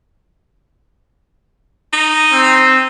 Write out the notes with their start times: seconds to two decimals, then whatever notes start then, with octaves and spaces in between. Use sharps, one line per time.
1.93 D#4
2.33 C4